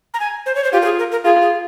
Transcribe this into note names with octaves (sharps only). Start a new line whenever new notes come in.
A#5
G#5
C5
C#5
C5
F4 G4
A#4
G#4
A#4
A#4
F4 G#4
G#4